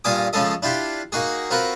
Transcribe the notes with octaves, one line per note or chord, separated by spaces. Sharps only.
G2 A#2 F4 G#5 D6 D#6
C#3 F3 G#3 A4 D#5
D4 E4 F4 G4 C6
A#3 D#4 F#4 G#4
C4 F4 F#4 A#4 B4